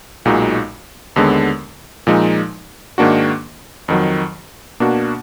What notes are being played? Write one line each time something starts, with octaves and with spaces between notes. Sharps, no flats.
B1 A#2 G#3 D#4 F#4
D#2 D3 G#3 B3
A#2 F3 G#3 D#4
G#2 D#3 A#3 D4 F#4
F2 D#3 F#3
B2 A#3 D4 F#4